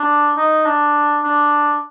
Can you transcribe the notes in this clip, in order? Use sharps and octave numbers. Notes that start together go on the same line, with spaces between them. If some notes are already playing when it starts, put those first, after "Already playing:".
Already playing: D4
D#4
D4
D4